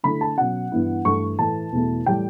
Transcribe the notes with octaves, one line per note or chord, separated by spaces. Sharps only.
D3 A3 E4 B5
A5
B2 F#3 C#4 F#5
G2 E3 B3 E4
G2 E3 A3 C#6
A2 E3 A3 A5
E2 B2 A3 E4
A2 E3 G3 G5